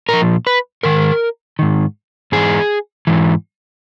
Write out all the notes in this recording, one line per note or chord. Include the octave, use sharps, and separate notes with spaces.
A#2 F3 A#4
B4
G#2 D#3 A#4
G#2 D#3
G#2 E3 G#4
G#2 E3